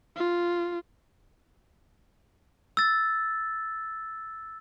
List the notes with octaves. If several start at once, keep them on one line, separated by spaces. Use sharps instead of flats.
F4
E6 A6